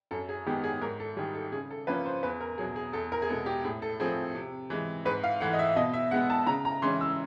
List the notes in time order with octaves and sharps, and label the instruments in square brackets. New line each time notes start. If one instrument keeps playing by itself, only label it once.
[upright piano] F#2 A4
G#4
D#3 G#3 B3 G4
G#4
G#2 A#4
A4
D#3 G3 G#4
A4
C#3 G#4
A4
F3 A#3 C#4 B4
C5
E2 B4
A#4
B2 F#3 G#4
G#4
E2 A4
A#4
G#4
B2 G#3 B3 A4
G4
A2 G#4
A4
F3 A3 C4 G#4
C3
E3 G#3
G#2 B4
F5
E3 A3 F#5
D#5
E5
B2 D#5
E5
G#3 B3 F#5
A5
C#3 A#5
A#5
E3 G#3 C#4 C6
E6